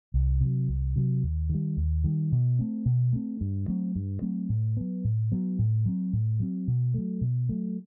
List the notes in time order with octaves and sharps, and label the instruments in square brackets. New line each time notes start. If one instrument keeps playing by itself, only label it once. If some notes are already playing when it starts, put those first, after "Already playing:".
[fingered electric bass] C2
C3 F#3
C2
C3 F#3
D#2
D#3 G3
D#2
D#3 G3
B2
A3 C4
B2
A3 C4
G2
F#3 A3 C4
G2
F#3 A3 C4
A2
F#3 B3
A2
F#3 B3
A2
F#3 C4
A2
F#3 C4
B2
F#3 A3
B2
F#3 A3